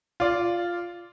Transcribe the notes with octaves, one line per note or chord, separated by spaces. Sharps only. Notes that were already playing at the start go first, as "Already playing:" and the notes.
F4 D5